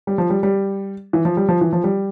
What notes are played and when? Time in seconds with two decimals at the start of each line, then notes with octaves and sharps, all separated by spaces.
0.07 G3
0.18 F3
0.30 G3
0.43 G3
1.13 E3
1.25 F3
1.37 G3
1.49 F3
1.61 E3
1.73 F3
1.84 G3